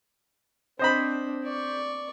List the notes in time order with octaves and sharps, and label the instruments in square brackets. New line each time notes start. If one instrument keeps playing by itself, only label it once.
[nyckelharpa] C4 D4 [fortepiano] C5 D#5 B5
[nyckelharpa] D5 C#6